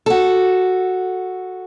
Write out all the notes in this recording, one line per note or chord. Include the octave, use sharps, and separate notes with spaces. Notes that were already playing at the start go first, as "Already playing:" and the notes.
F#4 A4